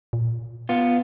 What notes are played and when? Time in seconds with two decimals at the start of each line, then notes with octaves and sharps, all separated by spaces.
0.13 A#2
0.69 B3 F4